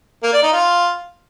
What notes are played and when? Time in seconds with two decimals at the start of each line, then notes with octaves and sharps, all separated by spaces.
0.23 A#3
0.33 D5
0.43 D#4
0.53 F4